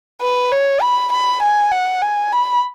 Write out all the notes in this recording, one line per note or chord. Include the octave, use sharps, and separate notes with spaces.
B4
C#5
B5
B5
G#5
F#5
G#5
B5